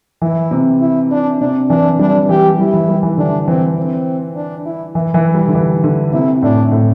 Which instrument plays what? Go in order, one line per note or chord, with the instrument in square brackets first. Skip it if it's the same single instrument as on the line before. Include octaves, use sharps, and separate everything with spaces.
[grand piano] E3 [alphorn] E4
[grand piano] C3
[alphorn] E4
D4
[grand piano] C3 [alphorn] D4
[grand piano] E3 [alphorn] D4
[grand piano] G3 [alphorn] D4
[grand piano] E3 [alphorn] G4
[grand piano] G3 [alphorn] E4
[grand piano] E3
G3
E3
[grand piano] D3 [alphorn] D4
[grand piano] E3 [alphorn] C4
[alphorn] C4
D4
E4
[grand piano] E3 [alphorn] E4
[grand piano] E3
G3
D3
E3
D3
[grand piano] C3 [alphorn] E4
[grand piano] A2 [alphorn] D4
[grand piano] A2